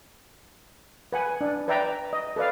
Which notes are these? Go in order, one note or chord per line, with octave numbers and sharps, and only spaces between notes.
B4 F#5 G#5
D4
B4 D5 E5 G5 A#5
D#5
A4 B4 D5 F5